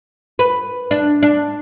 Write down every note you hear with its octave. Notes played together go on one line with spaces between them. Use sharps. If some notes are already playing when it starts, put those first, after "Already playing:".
B4
D4
D4